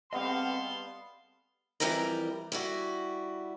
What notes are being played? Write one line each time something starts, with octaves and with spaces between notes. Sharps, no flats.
G3 B3 C4 A4 D#5 F5 F#5 C6
F2 E3 G3 A#4 G5 A#5
G3 E4 F#4